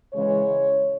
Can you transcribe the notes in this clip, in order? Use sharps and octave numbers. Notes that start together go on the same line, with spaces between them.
C#3 E3 G#3 C#5